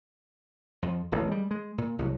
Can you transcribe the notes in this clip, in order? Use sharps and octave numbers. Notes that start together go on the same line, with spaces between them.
F2 E3 F3
D1 A1 A#2
G3 G#3 A#3
G#3
A#2
C2 C#3 F#3